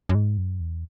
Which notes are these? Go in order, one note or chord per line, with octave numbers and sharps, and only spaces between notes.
F#2
G#2
F#2
E2